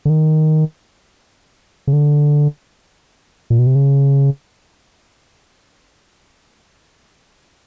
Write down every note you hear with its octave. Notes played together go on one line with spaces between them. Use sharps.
D3
D#3
C#3
D3
A#2
B2
C3
C#3